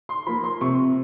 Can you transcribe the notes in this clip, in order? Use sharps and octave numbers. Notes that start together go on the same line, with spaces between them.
C6
F3 A#3 B5
C6
C3 C#6